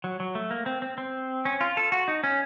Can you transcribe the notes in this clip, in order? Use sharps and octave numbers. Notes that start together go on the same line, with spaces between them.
F#3
F#3
A3
A#3
C4
C4
C4
C#4
F4
A4
F#4
D#4
C#4